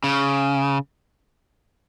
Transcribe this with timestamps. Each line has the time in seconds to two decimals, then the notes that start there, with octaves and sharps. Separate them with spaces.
0.04 C#3